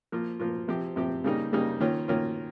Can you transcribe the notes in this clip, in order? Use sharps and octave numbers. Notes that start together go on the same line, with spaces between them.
F3 A#3 F4
F3 A#3 F4
C3 F3 C4 G4
C3 F3 C4 G4
C#3 G3 A#3 D#4
C#3 G3 A#3 D#4
D#3 A#3 C#4 F4
D#3 A#3 C#4 F4